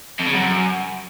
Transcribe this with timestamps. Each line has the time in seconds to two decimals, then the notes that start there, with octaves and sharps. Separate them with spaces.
0.20 F2
0.27 C#3
0.34 F#2